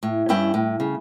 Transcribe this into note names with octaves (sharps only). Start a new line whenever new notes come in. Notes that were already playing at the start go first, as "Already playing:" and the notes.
A2
G2 C#4 E4 G5
A2
C#3